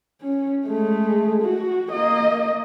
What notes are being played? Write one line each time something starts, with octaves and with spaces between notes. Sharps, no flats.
C#4
G#3 A3
F#4
A#3 D#5